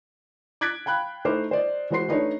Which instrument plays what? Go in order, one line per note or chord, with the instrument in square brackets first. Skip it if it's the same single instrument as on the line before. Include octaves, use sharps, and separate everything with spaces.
[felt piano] D6 F#6 G#6 A6 B6 D7
F5 G5 B5 F#6
A3 D#4 E4 C5 D6 F6
C5 D5 D#5
E3 G#3 F#4 C5 C6 C7
A3 D4 D#4 B4 C#5